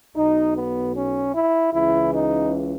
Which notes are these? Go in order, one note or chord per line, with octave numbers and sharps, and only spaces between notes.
B1 B2 D#4
B3
C#4
E4
C#2 C#3 E3 E4
D#4